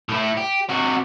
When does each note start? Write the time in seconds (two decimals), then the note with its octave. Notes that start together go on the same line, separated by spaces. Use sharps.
0.09 A2 E4
0.37 G4
0.69 C3 F#4